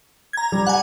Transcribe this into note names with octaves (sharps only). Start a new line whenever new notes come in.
A#5 G#6
G3
F#5 G#5